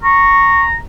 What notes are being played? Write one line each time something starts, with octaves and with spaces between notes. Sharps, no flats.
A#5 C#6